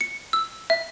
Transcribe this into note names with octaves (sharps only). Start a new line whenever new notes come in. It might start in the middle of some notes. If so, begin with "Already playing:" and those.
C#7
E6
E5